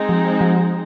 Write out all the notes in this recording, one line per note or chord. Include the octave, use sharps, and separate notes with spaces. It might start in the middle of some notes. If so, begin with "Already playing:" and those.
Already playing: G#3 C4 D#4
F3
F3